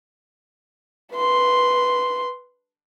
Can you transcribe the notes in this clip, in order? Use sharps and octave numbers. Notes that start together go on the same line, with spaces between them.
B4 C6